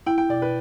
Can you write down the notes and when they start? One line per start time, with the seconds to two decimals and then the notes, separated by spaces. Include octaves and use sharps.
0.07 E4 G5
0.18 G5
0.29 B2 D5
0.42 B4